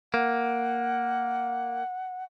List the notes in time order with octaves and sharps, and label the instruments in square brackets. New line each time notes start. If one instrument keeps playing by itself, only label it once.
[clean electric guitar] A#3 [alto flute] F#5